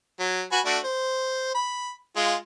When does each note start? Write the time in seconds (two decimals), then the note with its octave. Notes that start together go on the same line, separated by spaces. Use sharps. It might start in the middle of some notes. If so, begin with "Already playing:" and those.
0.20 F#3
0.52 F#4 B4 G#5
0.65 A3 D4 F#4
0.84 C5
1.55 B5
2.16 G#3 F4